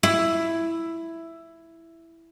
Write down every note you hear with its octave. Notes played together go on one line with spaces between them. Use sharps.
E4